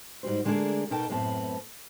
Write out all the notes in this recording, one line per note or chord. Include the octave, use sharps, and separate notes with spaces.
G#2 G3 F#4 C5
D3 G#3 A3 D4 G#4 A#4
B2 D#4 A4 A#4 G5 A5
F#2 A2 B3 C4 A5